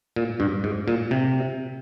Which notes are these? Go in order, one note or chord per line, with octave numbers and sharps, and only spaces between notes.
A#2
G2
G#2
A#2
C3